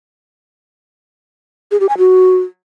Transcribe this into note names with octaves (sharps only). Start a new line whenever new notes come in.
G#4
G4
G#5
F#4